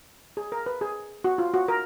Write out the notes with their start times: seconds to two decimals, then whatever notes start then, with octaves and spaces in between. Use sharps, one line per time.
0.37 G#4
0.52 A#4
0.66 B4
0.81 G#4
1.24 F#4
1.38 F4
1.54 F#4
1.68 A#4